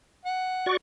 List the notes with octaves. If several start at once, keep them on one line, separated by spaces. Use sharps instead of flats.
F#5
F#4 D5 C#6